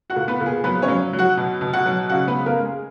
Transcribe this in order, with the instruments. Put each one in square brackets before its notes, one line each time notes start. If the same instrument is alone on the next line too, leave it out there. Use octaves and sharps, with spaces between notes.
[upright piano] F#4 F#5
A#2
B3 B4
A#2
G#4
F#3 B3 B4
C#4 C#5
F#3
F#3
F#4 F#5
B2
B2
F#4 F#5
F#3
C#3 F#4 F#5
B3 B4
G#3
A#3 A#4
G#3
G#4